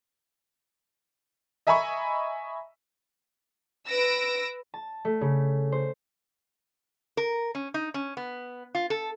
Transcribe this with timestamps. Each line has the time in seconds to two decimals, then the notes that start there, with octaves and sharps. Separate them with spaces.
1.67 D#5 E5 G#5 A#5 B5 C#6
3.87 B4 E6 A#6 D7
4.74 A5
5.05 A3
5.21 C#3
5.72 C5
7.17 A#4
7.55 C#4
7.74 D#4
7.94 C#4
8.17 B3
8.75 F4
8.90 A4